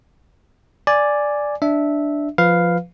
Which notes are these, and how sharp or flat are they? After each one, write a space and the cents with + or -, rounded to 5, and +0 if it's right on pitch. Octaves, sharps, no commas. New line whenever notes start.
D5 +0 G#5 +0
D4 +0 E5 -10
F3 +0 B4 +10 F5 +0